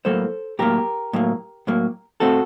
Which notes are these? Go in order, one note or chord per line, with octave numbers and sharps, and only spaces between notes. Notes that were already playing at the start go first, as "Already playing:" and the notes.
A2 F#3 A#3 A4 C5
A2 F#3 A#3 G4 A#4
A2 F#3 A#3
A2 F#3 A#3
A2 A3 C4 F#4 A4